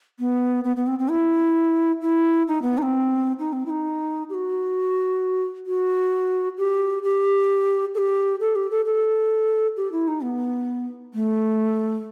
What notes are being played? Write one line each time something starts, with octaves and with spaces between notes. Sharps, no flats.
B3
B3
B3
C4
C4
E4
E4
D#4
B3
D#4
C4
D#4
C4
E4
D#4
G4
F#4
F#4
G4
G4
A4
G4
A4
G4
A4
A4
G4
E4
D#4
B3
A3